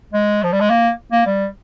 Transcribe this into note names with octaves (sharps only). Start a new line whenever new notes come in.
G#3
F3
G3
G#3
A#3
A#3
G3